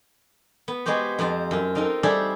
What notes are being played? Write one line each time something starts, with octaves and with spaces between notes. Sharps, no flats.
B3
G#3 B3 F#4 G4 C5
F2 F3 C5 A5
F#2 F4
C4 D#4 F4 A4 A#4
G3 G#4 A4 C5 D5 E5